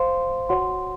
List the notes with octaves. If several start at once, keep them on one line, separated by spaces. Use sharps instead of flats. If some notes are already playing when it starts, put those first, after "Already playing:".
Already playing: C5 F5 C6
F#4 C#5 F#5 C6